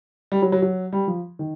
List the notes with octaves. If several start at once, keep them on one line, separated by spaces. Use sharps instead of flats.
G3
F#3
F#3
F#3
G3
F3
D#3